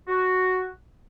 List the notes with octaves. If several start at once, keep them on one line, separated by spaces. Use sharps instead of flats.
F#4